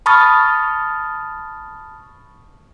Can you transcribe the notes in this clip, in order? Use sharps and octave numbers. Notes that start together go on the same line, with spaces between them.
A5 B5 C#6 D#6 F6 A6